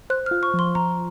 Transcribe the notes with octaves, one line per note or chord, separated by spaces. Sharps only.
C5 F#6
F6
F4
C#6
F3 C6
F3 A#5